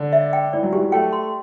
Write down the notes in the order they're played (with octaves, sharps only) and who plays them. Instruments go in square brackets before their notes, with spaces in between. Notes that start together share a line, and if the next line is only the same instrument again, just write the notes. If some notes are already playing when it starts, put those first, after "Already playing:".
Already playing: [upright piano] D3
[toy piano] E5
G5
[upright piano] E3 [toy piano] D5
[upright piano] F#3
[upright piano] E3 [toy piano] G4
[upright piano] F#3
[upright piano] A3 [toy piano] G5
[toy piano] C6